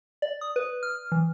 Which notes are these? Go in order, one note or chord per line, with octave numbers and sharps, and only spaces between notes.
D5
D#6
B4
F6
E3